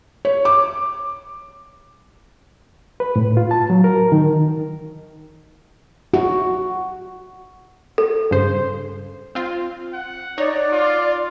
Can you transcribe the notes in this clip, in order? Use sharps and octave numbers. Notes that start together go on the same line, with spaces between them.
C#5
D6
B4
A2
F4
A5
F#3
A#4
D#3
F#4
A4
G2 C#3 C5
C4 F4
F#5
D#4 C#5 D5
F4